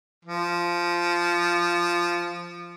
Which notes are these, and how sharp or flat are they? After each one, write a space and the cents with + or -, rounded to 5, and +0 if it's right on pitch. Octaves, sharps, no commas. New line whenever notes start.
F3 -10